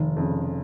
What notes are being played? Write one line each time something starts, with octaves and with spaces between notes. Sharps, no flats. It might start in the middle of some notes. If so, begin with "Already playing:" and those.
Already playing: F1 D#3
F2 C#3